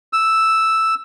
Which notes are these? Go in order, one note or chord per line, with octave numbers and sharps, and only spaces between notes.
E6